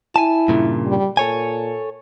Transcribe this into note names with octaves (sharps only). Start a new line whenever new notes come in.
E4 G#5 A5
G2 A#2 C#3
G3
A#2 A4 C#5 G#5